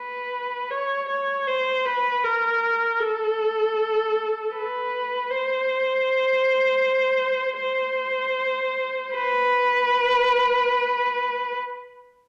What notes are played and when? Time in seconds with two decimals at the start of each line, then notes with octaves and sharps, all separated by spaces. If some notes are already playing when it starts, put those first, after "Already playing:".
Already playing: B4
0.71 C#5
1.09 C#5
1.47 C5
1.85 B4
2.24 A#4
3.00 A4
4.54 B4
5.30 C5
7.61 C5
9.14 B4